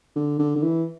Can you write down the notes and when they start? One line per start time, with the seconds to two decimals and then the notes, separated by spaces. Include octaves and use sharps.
0.16 D3
0.39 D3
0.56 D3
0.63 E3